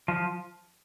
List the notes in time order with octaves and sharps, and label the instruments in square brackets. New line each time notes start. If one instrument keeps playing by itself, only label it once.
[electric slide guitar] F3